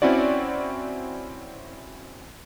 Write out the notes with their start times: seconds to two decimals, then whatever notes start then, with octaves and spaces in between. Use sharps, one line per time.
0.02 C4 C#4 E4 F#4 D5